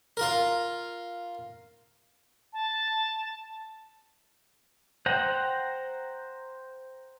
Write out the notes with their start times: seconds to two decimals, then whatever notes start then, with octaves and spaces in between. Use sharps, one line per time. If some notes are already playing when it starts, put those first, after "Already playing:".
0.17 F4 A#4
2.53 A5
5.06 C5 F#5 G5 A#5